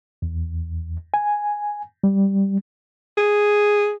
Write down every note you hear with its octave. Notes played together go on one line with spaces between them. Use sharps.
E2
G#5
G3
G#4